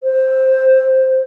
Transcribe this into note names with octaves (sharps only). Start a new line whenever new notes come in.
C5